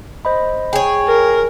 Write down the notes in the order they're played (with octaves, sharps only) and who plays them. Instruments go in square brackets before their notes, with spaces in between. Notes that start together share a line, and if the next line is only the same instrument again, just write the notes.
[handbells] C5 D#5 B5
[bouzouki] G#4 C#5 [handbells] G5
[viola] A#4